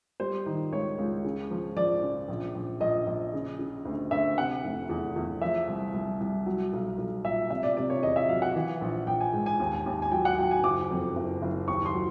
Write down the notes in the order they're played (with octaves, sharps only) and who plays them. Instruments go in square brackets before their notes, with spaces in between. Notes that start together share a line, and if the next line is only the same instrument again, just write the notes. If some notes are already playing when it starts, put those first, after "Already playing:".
[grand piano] G3 C5
D#3
C#2 C#5
C#2
C#3
F3
F3 D5
C#3
A#1
A#1
A#1 D#5
A#1
C#3
C#3
D2
D2 E5
C3 F#5
F1
E2
E2
F3 E5
C2
C2
C2
F#3
B1
B1
A#2 E5
C3 E5
D5
C3 D5
C#5
E2 D#5
E5
F#3 F5
F#5
E3
A#1
A#1 G5
G#5
G#2
G#5
D#2
D#2
G#5
F#3 G5
F#5
F#3 G5
G#5
F#1 D6
F2
F#1
F#1
D#2 C#6
C6
F#3